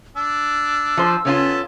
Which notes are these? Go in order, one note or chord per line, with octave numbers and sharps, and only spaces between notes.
D4 E6
F3 C5
C#3 B3 C#4 F4 A4